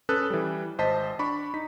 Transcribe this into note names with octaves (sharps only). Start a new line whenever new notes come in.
C#4 A4 B4 D#6 F#6
E3 G3
G#1 C5 D#5 A5 B6
D4 B5 C#6 D6
D#4 B6